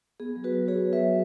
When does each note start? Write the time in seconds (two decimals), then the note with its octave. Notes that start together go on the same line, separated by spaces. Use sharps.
0.20 B3 G#4
0.36 F#3
0.44 F#4 B4
0.52 F#3
0.68 F#3 G#4 C#5
0.85 F#3
0.93 B4 E5
1.01 F#3